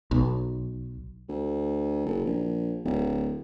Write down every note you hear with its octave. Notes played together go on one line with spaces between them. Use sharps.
B1
D2
F#1
A#1
D1